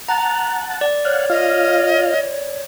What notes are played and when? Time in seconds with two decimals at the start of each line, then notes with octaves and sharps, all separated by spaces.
0.09 F#5 A5 A#5
0.81 D5
1.05 C#5 F5 F#5
1.30 F4 D#5 F5